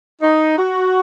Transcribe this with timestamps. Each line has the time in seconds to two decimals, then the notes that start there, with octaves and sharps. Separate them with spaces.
0.22 D#4
0.58 F#4